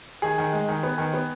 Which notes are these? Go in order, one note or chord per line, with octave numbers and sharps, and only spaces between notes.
D#3 G#4
D#3
G#3
D#3
B3
D#3
B3